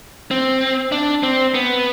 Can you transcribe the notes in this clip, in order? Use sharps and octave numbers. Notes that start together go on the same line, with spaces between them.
C4
D4
C4
B3